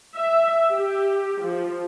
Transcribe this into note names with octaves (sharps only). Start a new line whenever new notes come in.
E5
G4
F3